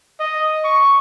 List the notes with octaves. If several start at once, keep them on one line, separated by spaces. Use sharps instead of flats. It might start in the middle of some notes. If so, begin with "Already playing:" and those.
D#5
C#6